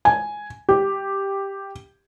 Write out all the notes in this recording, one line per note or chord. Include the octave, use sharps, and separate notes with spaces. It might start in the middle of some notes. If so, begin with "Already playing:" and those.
G#5
G4